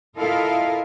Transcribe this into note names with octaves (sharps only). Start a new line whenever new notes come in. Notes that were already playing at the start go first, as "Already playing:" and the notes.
E4 F4 A4 A#4 D#5 F5